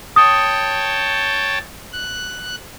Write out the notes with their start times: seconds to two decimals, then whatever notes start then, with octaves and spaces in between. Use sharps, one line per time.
0.16 C#5 G5 A5 D#6
1.92 F#6